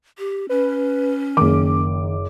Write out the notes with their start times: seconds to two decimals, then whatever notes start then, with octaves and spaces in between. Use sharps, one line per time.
0.19 G4
0.49 C#4 B4
1.37 F#1 D#3 D6